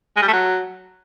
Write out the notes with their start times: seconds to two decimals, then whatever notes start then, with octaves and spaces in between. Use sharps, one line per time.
0.17 G#3
0.22 G3
0.28 A3
0.33 F#3